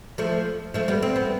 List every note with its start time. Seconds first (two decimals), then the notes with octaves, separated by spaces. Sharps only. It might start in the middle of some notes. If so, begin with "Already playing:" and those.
0.18 F3 A3
0.74 F3 A3
0.88 G3 B3
1.02 C4
1.16 B3